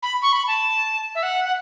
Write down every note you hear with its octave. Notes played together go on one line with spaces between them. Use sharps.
B5
C#6
B5
A5
E5
F#5
F#5